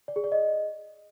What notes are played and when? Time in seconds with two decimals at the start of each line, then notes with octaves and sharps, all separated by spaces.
0.08 D5
0.16 G#4
0.24 D5
0.32 D#5